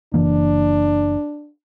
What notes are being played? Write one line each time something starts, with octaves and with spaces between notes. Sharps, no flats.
F#1 E3 A#3 D4